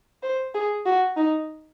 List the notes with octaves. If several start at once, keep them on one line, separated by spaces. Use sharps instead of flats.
C5
G#4
F#4
D#4